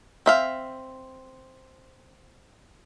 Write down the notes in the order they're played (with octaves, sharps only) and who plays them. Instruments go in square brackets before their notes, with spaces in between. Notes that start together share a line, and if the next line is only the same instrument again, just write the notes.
[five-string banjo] C4 E5 F5